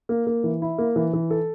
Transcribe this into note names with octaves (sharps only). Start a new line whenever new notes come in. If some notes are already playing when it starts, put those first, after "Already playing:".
A#3
A#3
E3
E4
A#3
E3
E3
A4